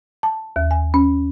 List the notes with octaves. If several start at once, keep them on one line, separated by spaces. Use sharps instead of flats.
A5
D#2
G#5
C#4